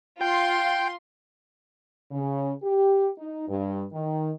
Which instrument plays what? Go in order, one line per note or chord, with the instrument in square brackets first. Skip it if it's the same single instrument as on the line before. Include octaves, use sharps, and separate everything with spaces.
[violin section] F4 C6 [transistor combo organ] G5
[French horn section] C#3
G4
D#4
G2
D#3